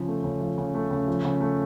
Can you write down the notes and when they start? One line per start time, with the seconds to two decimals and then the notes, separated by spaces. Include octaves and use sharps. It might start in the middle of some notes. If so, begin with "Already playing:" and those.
Already playing: C#3 F3
0.08 A3
0.24 C#3
0.41 F3
0.58 C#3
0.74 A3
0.91 C#3
1.08 F3
1.25 C#3
1.41 A3